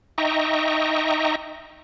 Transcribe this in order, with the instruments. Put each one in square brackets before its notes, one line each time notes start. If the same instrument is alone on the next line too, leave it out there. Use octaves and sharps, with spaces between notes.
[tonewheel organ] D#4 D#5 E5 G5 A#5 C#6